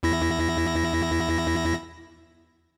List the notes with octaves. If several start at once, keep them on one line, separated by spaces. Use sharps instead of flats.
E2 E4 A#6